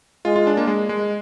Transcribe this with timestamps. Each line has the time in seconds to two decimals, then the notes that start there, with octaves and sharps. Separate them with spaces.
0.25 G#3 F4
0.36 F4
0.47 D4
0.57 A#3
0.67 G#3
0.89 G#3